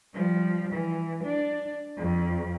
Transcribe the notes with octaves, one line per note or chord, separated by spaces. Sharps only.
F3 G3
E3
D4
F2